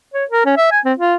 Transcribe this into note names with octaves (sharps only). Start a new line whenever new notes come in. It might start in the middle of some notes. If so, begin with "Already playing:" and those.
C#5
A#4
C#4
E5
G#5
C4
F4